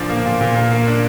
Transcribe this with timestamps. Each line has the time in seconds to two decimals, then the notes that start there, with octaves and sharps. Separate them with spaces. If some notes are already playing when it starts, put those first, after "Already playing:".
Already playing: A#2 F3 D4
0.10 A#3
0.26 A#2
0.41 A#2
0.56 A#3
0.71 A#3
0.87 D4